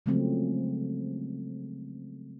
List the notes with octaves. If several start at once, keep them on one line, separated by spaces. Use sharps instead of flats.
C#3 F3 F#3 G#3 A3 C4